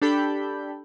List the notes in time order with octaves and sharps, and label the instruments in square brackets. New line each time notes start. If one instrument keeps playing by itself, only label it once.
[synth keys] D4 G4 A4 B5 G6